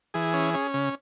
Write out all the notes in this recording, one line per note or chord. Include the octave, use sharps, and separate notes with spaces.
E3 G#4
C#4
C#4
C#3